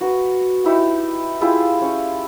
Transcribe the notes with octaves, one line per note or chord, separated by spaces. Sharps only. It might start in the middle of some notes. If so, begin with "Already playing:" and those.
F#4 B4 A#5
D#4 E4 G4 F#5
E4 F4 G4 G#4
C#4